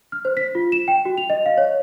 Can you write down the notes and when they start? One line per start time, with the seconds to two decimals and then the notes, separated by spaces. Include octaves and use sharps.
0.12 F6
0.25 C5
0.37 B6
0.55 F4
0.72 E7
0.88 G5
1.05 F#4
1.18 F7
1.30 D#5
1.46 F5
1.58 C#5